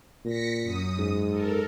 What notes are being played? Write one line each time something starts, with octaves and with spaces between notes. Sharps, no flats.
A#2 A#6 B6 C#7
F#2 D#6
G#2
A4 A#4